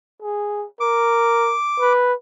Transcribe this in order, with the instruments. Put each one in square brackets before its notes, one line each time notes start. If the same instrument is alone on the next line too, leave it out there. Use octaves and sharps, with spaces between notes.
[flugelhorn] G#4
[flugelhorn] A#4 [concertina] D6
[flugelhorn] B4